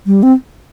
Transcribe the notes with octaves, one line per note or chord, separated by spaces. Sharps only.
G3
C4